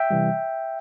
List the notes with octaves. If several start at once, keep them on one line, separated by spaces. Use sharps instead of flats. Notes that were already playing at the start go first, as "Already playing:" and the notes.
Already playing: E5 G5
C3 E3 G3